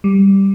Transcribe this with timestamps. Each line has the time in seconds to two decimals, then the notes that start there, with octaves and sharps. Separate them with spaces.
0.04 G3